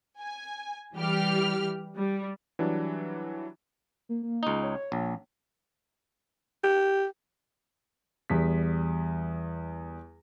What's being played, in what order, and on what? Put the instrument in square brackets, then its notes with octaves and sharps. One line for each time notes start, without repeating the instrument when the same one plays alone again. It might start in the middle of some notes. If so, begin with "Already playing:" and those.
[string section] G#5
E3 G3 G4 F6
G3
[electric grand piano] E3 F#3 G3 D4
[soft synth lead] A#3
A#3
[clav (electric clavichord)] C#2 D#4
[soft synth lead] C#5
[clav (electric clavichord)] A#1
[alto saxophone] G4
[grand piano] E2 G3 B6